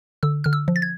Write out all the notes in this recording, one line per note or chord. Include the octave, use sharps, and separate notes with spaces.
D3 E6
D3 F6
E6
F3
A6
G#6